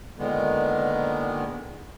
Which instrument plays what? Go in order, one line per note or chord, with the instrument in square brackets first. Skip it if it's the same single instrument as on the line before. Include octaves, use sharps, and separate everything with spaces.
[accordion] A#2 D3 D#3 G#3 B3